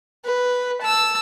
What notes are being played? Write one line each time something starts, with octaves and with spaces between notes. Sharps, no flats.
B4
A5 E6